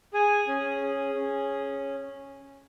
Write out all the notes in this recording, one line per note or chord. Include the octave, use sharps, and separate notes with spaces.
G#4 G#5
C#4
G#4
C#4